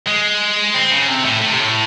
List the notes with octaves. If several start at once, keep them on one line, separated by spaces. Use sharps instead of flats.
G#3
C4
C#3
C3
A2
A2
C3
A2